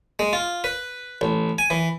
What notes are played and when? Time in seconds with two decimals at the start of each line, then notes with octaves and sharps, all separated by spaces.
0.19 G#3
0.33 F4
0.64 B4
1.21 A1
1.58 G#5
1.70 E3